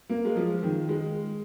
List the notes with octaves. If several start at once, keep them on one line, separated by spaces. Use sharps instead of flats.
A#3
G#3
F3
D#3
G#3